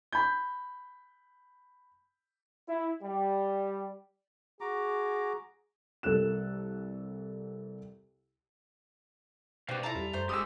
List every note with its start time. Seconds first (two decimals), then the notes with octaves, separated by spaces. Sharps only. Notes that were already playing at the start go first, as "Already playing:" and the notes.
0.13 B5 G6
2.69 E4
3.03 G3
4.61 F#4 G#4 A#5 D6
6.03 C2 A4 A#4 F#6 E7
9.69 B2 C4 G4 B4 D5 F5
9.83 E4 F4 A4 A#5
9.95 E2 G3
10.13 F#2 A3 C5
10.29 D1 G#3 G4 D#6 E6